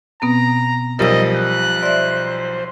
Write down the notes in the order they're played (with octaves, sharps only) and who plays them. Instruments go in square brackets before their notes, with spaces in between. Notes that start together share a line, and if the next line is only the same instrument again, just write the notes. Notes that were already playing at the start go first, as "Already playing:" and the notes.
[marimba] B2 B3 C4 [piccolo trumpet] A#5
[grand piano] B1 F3 G3 [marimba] A#4 E6 [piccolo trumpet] D#5
[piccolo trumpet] F#6
[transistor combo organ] C5 [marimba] D5 E5